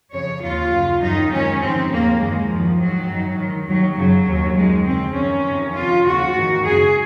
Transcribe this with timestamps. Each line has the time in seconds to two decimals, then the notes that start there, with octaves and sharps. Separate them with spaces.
0.13 F2 C#3 C#5
0.42 D#2 D#3 F4
0.72 F#2 C#3
1.02 F#2 D#3 D#4
1.31 G#2 D#3 C#4
1.61 F2 C3 D#3 C4
1.91 D#2 C#3 A#3
2.20 F#2 D#3 G#3
2.49 F#2 D#3 F3
2.79 G#2 D#3 F#3
3.09 F#2 D#3
3.38 G#2 D#3
3.69 D#2 D#3 F#3
3.98 F#2 C#3 F#3
4.28 D#2 D#3
4.57 F#2 D#3 G#3
4.87 F2 C#3 C4
5.17 F#2 D#3 C#4
5.46 F2 C3 D#3
5.76 F2 C3 D#3 F4
6.05 D#2 C#3 F#4
6.35 G#2 D#3
6.65 F#2 C#3 G#4